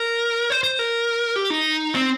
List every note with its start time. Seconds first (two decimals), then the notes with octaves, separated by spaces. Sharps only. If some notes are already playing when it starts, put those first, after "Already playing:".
Already playing: A#4
0.50 C5
0.63 C5
0.79 A#4
1.36 G4
1.50 D#4
1.95 C4